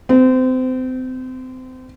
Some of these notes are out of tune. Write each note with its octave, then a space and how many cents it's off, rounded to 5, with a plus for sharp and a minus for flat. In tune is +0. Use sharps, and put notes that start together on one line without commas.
C4 -30